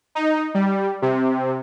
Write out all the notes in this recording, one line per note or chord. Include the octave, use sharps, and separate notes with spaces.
D#4
G3
C3